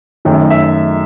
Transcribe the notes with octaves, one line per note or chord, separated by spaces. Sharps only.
F#2 D#3 A3 G5
E5
D#5
E5